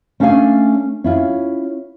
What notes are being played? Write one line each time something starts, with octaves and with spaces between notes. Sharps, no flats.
A3 C#4 D4 A4 F5 G#5
C#4 E4 F4